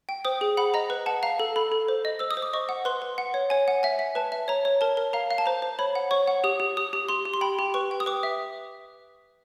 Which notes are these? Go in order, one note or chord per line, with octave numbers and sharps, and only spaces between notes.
G5
C5 D#6
G#4
F#5 B5
D#5 A#5
B4
F#5 A5
F5 A#5
A4
A4 B5
A4
C5
D#5
C5 E6
D#6
C5
D6
D#5 C#6
F#5
B4 C6
B4
F#5
C#5
C#5 G#5
F#5
E5 G#5
E5
B4 A5
E5
C#5 A#5
C#5
A#4 A5
A#4
F5 A#5
F5
A5
C5 A#5
C5
C#5 B5
F#5
C#5 C#6
F#5
G4 D#6
G4
G4 D#6
G4
G4 C6
G4
C6
G5 B5
G4
B4 C#6
G5
D#6
B4 D6
E5